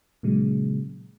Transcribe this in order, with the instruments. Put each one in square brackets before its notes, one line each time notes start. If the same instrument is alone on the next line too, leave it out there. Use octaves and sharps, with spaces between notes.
[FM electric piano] A#2 C#3 F#3 G#3